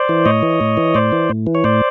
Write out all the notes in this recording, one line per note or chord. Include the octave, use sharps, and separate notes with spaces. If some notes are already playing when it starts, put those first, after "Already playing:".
Already playing: C5 D5
E3
A2 C#5 D#5
E3
A2
E3
A2 C5 D5
E3
A2
E3
C#5
A2 C5 D5